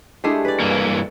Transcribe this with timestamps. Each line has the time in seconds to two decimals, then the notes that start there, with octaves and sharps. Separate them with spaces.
0.24 G#3 A3 D4 E4 G4 G#4
0.45 B4 D5
0.60 G2 E3 A#3